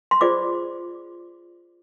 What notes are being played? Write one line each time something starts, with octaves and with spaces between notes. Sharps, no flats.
C6
F4 G#4 C5 D5 D6